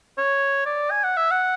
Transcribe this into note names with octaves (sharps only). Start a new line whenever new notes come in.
C#5
D5
G#5
F#5
E5
F#5